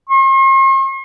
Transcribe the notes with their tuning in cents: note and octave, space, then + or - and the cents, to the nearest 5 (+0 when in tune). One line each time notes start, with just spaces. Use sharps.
C6 +45